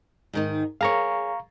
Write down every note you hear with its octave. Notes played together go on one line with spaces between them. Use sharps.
G#2 D#3 D#4
G#4 A#4 C#5 F5 A#5 C#6